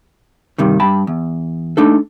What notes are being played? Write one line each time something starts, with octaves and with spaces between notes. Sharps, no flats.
G2 C3 D#3
G2 G5 A5 B5
E2
A3 D4 D#4 A4